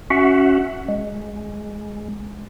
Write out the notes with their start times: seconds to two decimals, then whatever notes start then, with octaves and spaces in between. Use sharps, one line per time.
0.10 C#4 F#4 E5 F#5
0.88 G#3